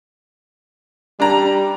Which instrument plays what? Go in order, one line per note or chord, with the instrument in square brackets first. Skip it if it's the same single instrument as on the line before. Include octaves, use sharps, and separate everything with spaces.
[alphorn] G3 [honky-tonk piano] D4 A#5